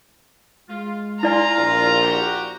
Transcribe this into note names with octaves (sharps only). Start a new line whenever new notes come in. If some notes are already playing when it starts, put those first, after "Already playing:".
G#3 F4
E4 F4 D5 G#5 A#5
A#1
F#4 G4